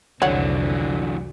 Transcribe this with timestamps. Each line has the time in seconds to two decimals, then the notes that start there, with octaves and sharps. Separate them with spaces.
0.22 C2 F2 D3 E3 F#3 C#5 F#5